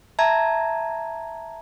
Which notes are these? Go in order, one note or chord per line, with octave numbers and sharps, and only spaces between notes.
E5 A5 A#5 G#6